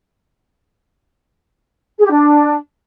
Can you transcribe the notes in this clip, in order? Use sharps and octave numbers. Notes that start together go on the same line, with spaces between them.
G#4
G4
D4